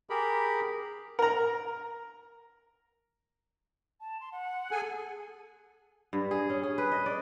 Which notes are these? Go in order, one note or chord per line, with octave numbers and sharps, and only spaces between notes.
G4 G#4 A#4 B5
A#4 A#5
A5
C6
F#5
G#4 A4 G#5
G2
G#4
C#4
G#4
B4
D#5
D5